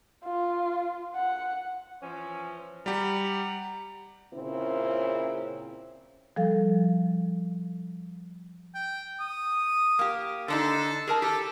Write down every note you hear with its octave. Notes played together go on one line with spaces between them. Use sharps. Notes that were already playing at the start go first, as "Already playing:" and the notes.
F4
F#5
E3 F3 C#4
G3 G4 F#5 A#5
A#2 C#3 C4 C#4 E4
F3 G3 A4 F5
G5
D#6
A#3 G4
D3 D4 D#4 A4
G#4 A#4 A5
G4 A4